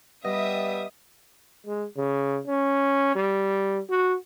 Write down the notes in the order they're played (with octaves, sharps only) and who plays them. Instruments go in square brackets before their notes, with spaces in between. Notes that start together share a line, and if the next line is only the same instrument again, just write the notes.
[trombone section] G3 [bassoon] B3 [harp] D#5 [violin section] E5 D#6
[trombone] G#3
C#3
C#4
G3
F#4